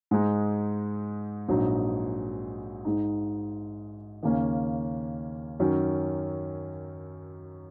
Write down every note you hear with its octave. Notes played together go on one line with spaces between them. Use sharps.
G#2 G#3 D#4
A#1 G#2 F#3 D#4
G#2 G#3 D#4
D#2 C#3 A#3 C#4
F#2 D#3 F#3 C#4